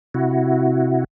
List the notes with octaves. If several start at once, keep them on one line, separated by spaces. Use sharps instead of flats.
C3 E4 F#4